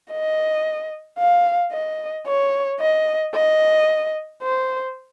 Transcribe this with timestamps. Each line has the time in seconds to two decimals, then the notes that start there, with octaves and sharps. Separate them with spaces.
0.12 D#5
1.18 F5
1.72 D#5
2.27 C#5
2.80 D#5
3.35 D#5
4.42 C5